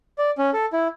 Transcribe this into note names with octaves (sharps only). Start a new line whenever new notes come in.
D5
C#4
A4
E4